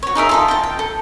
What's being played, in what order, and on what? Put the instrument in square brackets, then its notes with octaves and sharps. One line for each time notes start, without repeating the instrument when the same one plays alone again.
[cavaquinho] F#4 C#5
D#4 G#4 A#4 E5
F4 A4 D#5
G5 A5
G5
A4